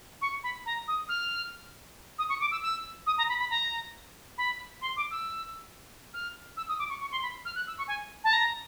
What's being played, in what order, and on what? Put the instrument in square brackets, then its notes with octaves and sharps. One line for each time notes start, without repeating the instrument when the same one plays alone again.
[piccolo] C#6
B5
A#5
D#6
F6
D#6
C#6
D6
E6
E6
D#6
A#5
B5
B5
A#5
B5
C6
D6
E6
F6
E6
D#6
D6
C#6
C#6
C6
B5
F6
F#6
E6
C#6
G#5
A5
A#5